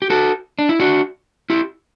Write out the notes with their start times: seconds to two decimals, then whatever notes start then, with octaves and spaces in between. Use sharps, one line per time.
0.02 G4
0.10 F#4 A4
0.59 D4
0.69 E4
0.80 D4 F#4
1.50 E4 G4